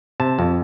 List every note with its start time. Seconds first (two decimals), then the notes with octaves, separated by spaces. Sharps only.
0.20 C3 A5
0.39 F2